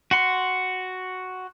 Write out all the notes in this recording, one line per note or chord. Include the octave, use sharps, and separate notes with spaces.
F#4 F#5 C6